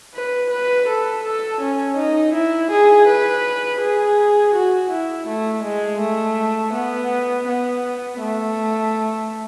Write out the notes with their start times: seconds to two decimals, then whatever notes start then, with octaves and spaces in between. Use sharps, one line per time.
0.15 B4
0.51 B4
0.88 A4
1.24 A4
1.61 C#4
1.97 D#4
2.34 E4
2.71 G#4
3.08 B4
3.82 G#4
4.55 F#4
4.91 E4
5.28 A3
5.64 G#3
6.00 A3
6.74 B3
7.48 B3
8.21 A3